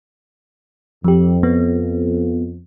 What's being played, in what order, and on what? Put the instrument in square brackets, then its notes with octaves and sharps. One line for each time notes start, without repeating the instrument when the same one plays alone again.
[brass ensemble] F2 [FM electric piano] F3 G4
[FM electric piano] B3